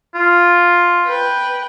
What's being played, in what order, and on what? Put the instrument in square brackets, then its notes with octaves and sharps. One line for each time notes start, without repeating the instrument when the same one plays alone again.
[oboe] F4
[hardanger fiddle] B4 G5